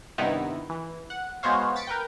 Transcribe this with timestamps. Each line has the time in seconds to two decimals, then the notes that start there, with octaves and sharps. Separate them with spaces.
0.18 G2 C3 D#3 B3 D#4 E4
0.70 E3
1.10 F#5
1.43 G#3 B3 F#4 C5 C#5 F5
1.76 A6 B6 C#7 D7
1.87 A#4 B4 G5